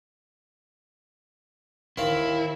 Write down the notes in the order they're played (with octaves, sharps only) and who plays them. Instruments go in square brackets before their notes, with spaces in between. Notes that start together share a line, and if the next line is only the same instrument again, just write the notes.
[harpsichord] D#2 C4 F5 [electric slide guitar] E4